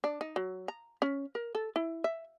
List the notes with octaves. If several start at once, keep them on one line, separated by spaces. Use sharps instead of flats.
D4
D#4
F#3
A#5
C#4
A#4
A4
E4
E5